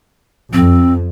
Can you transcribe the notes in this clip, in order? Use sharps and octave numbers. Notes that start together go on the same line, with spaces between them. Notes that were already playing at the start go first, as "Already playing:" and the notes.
F2 C4